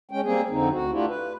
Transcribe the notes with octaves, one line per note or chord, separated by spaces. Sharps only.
G#3 C#4 G5
G3 A#3 C4 G#4
F2 D3 C4 D#4
D2 F#4
A3 D4 E4 F4 G4
B4